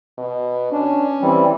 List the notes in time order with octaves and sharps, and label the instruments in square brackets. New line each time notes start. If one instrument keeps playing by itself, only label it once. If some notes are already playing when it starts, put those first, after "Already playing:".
[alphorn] B2
[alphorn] C#4 [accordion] D4
[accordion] E3 G3 C4